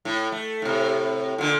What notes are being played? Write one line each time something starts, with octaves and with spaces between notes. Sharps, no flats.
A2
A3
A2 C3
A#2 D3